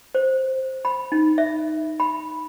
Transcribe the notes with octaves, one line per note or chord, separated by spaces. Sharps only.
C5
B5
D#4
E5
B5